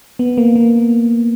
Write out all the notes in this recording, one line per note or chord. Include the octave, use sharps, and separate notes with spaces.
B3
A#3
A#3